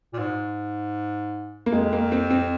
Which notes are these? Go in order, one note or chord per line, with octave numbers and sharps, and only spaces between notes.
A#2
G#2
A#3
F2 G#3
A#3
C4
C4